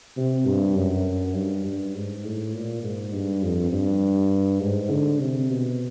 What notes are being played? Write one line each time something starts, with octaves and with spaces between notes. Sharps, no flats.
C3
G2
F#2
G2
G2
G#2
A2
A#2
G#2
G2
F2
G2
G#2
D3
C3
B2